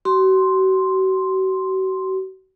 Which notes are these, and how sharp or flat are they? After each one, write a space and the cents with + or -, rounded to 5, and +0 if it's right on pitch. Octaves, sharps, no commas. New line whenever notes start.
F#4 +40 C6 +0